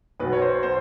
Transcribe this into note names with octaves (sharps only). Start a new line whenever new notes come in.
B1 B2 F#3 B4
C#5
C5
B2 C5